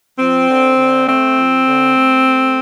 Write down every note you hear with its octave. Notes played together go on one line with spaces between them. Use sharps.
F3 C4
D3
D3
A3 C4
F3
D3
A3
A3